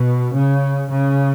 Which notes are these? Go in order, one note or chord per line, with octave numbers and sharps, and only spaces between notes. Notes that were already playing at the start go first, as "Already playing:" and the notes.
Already playing: B2
C#3
C#3